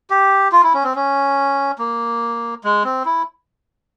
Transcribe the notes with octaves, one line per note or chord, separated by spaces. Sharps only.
G4
F4
E4
C#4
C4
C#4
A#3
G#3
C4
E4